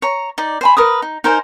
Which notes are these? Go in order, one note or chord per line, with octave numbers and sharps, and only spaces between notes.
C#5 A#5
D#4 D5
C5 G#5 B5
A#4 B4 D#6
D#4
D#4 A#4 C5 G#5